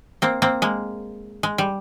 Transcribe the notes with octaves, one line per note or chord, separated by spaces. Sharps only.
A#3 C4
A#3 C4
G#3 A#3
G#3
G3